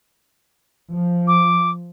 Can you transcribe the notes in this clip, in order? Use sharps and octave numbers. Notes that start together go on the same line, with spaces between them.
F3
D6